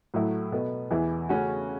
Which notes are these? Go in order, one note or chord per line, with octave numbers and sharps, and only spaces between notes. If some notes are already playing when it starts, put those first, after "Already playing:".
A2 F#3 A3 E4
B2 B3 A4
E2 E3 B3 E4
C#3 A3 C#4 F#4